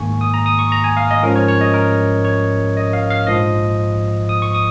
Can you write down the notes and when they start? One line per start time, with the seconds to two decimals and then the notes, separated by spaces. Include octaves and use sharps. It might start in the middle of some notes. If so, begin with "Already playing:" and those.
Already playing: G#2 D#3 A#3 G#5 C#6
0.21 D#6
0.34 A#5
0.46 D#6
0.59 C#6
0.72 A#5
0.84 G#5
0.97 F5
1.11 D#5
1.23 G#2 F3 C#4 A#4
1.36 C#5
1.48 C#5
1.61 D#5
1.74 A#4
2.25 C#5
2.77 D#5
2.93 F5
3.10 F5
3.27 A#1 G#2 F3 D#5
4.29 D#6
4.42 C#6
4.54 D#6